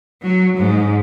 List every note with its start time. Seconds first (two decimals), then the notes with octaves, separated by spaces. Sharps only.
0.24 F#3
0.59 G#2